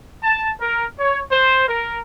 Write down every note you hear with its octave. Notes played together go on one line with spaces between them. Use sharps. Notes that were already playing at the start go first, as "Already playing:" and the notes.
A5
A#4
C#5
C5
A#4